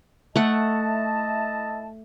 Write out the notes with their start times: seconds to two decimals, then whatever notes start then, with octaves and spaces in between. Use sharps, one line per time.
0.36 A3 E4 D#5 F#5 A5